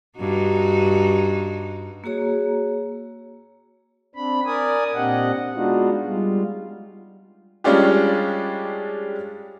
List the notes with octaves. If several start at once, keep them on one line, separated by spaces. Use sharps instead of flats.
G2 D#4 F#4
A#3 F#4 G#4 C#5 A#5
C4 D4 B5
A#4 D5 G#5 D#6
A#2 C4 D4 G4 D#5 F#5
G#3 B3 D4 D#4 F4 F#4
G3 G#3 F4
G3 G#3 C#4 D4 F4 G4